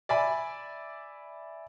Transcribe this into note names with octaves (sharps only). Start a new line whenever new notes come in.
D5 E5 G#5 B5